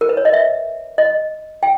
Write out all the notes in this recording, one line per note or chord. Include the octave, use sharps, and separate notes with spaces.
A#4
B4
C#5
D#5
E5
D#5
G5